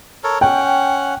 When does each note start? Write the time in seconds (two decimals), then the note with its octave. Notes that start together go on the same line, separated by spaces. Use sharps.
0.24 A4 A#4 C#5
0.41 C#4 F#5 G5